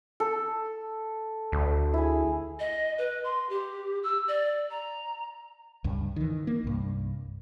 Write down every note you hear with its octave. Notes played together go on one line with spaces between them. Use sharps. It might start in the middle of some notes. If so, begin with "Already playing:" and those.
A4
D2
E4 G#4
D#5
B4
C6
G4
E6
D5
A#5
C#2 G2
D#3 E3
A#3
C2 G2